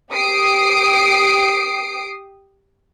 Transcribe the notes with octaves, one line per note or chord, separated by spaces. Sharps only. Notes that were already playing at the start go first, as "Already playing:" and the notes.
G4 D#6 C7 D7